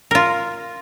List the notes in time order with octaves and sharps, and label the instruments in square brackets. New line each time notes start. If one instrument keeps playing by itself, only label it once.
[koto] F4 A#4